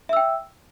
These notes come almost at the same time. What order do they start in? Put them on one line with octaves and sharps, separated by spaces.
E5 E6 G5